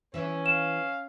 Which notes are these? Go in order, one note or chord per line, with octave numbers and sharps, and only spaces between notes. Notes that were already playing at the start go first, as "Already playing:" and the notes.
E3 C#4 E4
F5 E7